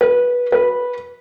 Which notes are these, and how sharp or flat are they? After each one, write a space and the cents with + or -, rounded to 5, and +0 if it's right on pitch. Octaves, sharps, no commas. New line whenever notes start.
B4 -15
B4 -10